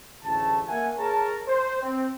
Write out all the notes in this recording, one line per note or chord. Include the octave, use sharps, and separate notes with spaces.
A1 D2 C#3 A3 A5
A#3 A#4 E5 F#5 G#5
G#4 A#4 C#5 A5
C5
C4